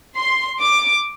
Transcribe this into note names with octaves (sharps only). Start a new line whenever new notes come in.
C6
D6